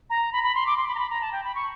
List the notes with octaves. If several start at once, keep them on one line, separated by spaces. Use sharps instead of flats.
A#5
B5
B5
C6
D6
C6
B5
A#5
B5
A#5
A5
G5
B5
C#6